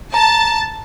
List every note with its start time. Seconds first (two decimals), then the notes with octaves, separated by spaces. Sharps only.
0.14 A5 A#5